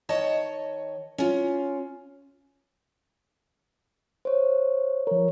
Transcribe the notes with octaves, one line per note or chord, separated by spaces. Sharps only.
D#3 C#5 D#5 A5
C#4 F4
C5 C#5
F3 A#4 C#5